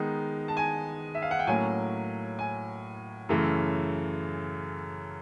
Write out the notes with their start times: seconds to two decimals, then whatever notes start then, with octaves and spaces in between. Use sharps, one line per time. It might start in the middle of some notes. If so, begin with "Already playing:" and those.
Already playing: D#3 G#3 B3 D#4
0.48 A5
0.57 G#5
1.15 E5
1.22 F5
1.31 F#5
1.39 G5
1.47 A2 F#3 A#3 C#4 G#5
2.39 G#5
3.29 F#2 C#3 E3 A3